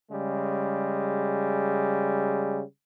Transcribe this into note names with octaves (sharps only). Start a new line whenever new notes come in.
C#3 G3 G#3